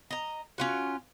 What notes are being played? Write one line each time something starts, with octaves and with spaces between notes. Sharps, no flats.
D#5 A#5
C#4 F4 F#4